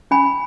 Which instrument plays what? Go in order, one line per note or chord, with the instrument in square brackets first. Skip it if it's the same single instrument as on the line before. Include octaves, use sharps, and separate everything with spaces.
[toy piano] C#4 G#5 B5